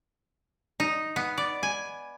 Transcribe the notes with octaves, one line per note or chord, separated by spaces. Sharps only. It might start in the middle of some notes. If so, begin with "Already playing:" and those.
D#4
B3
D5
G#5